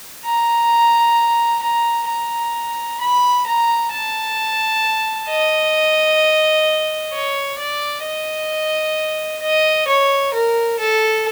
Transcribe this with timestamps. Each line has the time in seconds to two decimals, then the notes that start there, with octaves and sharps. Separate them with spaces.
0.25 A#5
1.62 A#5
2.08 A#5
3.00 B5
3.47 A#5
3.92 A5
5.29 D#5
7.13 C#5
7.59 D5
8.04 D#5
9.42 D#5
9.88 C#5
10.34 A#4
10.79 A4